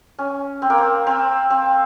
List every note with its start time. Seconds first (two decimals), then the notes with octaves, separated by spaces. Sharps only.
0.19 C#4
0.62 C4
0.70 A#3
0.78 C4
1.07 C4
1.50 C4